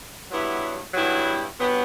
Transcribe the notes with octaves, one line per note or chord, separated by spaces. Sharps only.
G2 F#3 B3 E4 G4
G2 F#3 B3 E4 G4
G2 F#3 B3 E4 G4